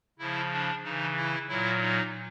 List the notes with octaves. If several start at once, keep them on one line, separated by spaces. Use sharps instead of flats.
C#3 F3 E4
D4
C#3 E3 D#4
E4
A#2 F#3 E4
D#4